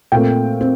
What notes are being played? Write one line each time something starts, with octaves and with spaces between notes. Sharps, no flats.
A#2 A3 C4 G5
C4